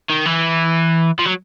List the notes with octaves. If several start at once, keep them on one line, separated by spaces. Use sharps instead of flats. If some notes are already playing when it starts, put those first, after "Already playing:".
D#3
E3
F3
F#3